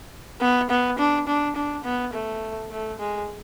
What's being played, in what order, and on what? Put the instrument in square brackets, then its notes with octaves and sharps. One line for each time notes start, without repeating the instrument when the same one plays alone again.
[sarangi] B3
B3
D4
D4
D4
B3
A3
A3
G#3